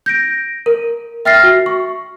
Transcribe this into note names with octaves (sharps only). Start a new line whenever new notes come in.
G6 A#6 D7
A#4
E5 G5 F6 A6 A#6 C7
F#4
C#6